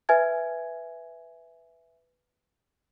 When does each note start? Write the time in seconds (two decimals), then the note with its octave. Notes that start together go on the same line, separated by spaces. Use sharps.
0.09 B4 E5 G#5 G#6